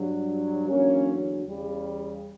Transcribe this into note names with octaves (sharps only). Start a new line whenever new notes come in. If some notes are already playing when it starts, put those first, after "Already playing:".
Already playing: G2 F#3
E2 D3 F#3 A#3 C#4
E2 C#3 G3